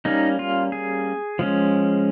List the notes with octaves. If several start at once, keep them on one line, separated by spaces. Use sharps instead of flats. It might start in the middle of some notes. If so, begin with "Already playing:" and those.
G3 A#3 C#4 D#4
F4
G#4
F3 G#3 C#4